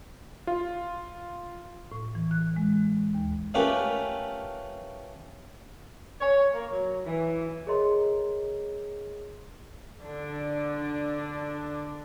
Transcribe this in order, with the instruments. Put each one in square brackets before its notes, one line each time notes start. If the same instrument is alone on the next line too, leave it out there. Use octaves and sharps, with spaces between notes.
[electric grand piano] F4
[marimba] A2
E3
F#6
G#3
D#2
[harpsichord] A3 C#4 F4 G4 A#4 B4
[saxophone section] C#5
A#3
F#3
E3
[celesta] G#4 A#4 C#5 D#5 A#5 C6
[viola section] D3 D4